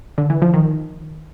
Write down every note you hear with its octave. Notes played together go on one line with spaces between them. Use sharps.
D3
E3
F3
D#3